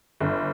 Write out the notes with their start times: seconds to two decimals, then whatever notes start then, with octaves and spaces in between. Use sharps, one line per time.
0.20 G1